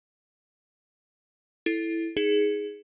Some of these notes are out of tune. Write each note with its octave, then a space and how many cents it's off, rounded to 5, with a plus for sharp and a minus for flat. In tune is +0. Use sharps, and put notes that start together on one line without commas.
E4 +0 A4 +0
D#4 +15 G#4 +0